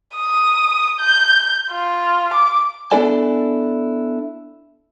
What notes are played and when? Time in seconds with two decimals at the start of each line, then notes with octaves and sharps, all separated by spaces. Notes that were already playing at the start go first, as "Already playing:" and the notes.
0.16 D#6
1.00 G6
1.71 F4
2.34 D6
2.92 B3 D4 E4 A4 D5 G#5